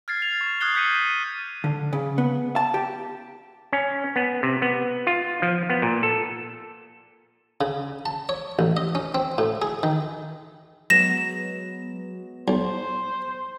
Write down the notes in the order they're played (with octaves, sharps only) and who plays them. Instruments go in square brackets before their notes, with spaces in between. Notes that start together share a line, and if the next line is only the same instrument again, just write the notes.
[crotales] F6 G#6 A6 C7
F7
C#6
D#6 F6 F#6 G#6 C7 G7
D6 G6 B6 C#7 D#7
D#7
[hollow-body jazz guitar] D3
C#3
B3
A5
G4
[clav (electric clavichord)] C#4
B3
C3
B3
F4
F3
B3
A#2
A4
[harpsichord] C#3
A5
C#5
A1
D#5
C#4
C4
A2
G#4
D#3
[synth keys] F#3 G#3 B3 [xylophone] A#6 E7
[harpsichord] B1 [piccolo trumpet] C5